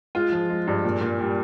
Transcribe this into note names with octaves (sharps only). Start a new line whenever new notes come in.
G#3 F4
F3
G#3
G2
A#2
A#2
G3